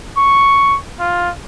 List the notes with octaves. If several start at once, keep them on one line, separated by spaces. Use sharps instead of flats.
C#6
F4